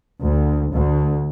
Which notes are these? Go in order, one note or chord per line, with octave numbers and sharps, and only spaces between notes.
D2
D2